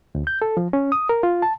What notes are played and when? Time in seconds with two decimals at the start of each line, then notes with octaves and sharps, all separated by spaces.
0.15 D2
0.27 G6
0.42 A4
0.57 F3
0.73 C#4
0.92 D#6
1.09 A#4
1.23 F4
1.42 A5